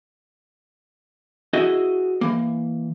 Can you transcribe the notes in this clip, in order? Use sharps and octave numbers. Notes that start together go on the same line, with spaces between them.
E4 F#4 G#4 D#5
E3 A#3